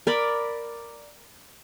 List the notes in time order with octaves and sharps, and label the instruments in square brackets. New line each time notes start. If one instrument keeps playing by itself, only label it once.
[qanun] A#4 D5 B5